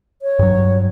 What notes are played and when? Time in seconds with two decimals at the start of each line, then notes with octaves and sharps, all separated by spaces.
0.22 C#5
0.39 G2 F#3